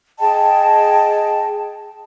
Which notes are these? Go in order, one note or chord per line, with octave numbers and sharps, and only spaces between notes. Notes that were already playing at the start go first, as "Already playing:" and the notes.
G#4 D#5 G5 A5